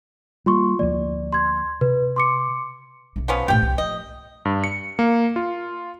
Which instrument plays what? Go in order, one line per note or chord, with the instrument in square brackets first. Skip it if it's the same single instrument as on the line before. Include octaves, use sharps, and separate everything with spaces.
[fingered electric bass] G3 A#3 [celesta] F4 C6 C#6
[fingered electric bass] D2 F3 A#3 [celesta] D5
[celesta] C6 G#6
[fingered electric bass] C3 [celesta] B4
[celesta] C6 D6 C#7
[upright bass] B1 C3
[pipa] F3 B3 C#4
[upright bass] A#1 A2 [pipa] G4 G5
[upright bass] C2
[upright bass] F3 [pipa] D#5
[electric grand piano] G2
C#7
A#3
F4